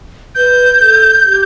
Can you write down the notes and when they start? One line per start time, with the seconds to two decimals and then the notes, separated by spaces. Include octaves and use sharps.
0.35 B4 G6
0.80 A4
1.25 G4